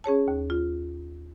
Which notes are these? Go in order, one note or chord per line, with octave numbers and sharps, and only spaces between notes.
C#4 G#4 C#5 A5
D#2
F4